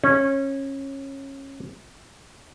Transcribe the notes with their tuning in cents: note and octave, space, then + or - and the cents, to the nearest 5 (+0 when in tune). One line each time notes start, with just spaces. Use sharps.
C#4 -20